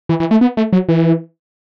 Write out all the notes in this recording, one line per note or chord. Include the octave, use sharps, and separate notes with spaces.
E3
E3
A3
B3
A3
F#3
E3